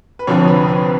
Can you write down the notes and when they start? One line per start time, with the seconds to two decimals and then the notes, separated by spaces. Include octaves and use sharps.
0.19 B4
0.27 F1 F2 D3 F3 C#5
0.48 B4
0.68 B4